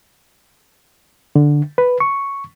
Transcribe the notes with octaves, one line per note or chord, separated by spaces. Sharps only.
D3
B4
C#6